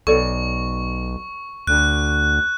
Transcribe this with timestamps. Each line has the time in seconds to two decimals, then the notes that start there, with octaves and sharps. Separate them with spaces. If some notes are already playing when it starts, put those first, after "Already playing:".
0.07 B1 A4 C#5 D5 C#6
1.67 D2 F#6